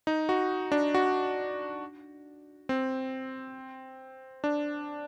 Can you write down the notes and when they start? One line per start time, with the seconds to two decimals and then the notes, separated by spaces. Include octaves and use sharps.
0.07 D#4
0.29 F#4
0.72 D4
0.94 F#4
2.69 C4
4.44 D4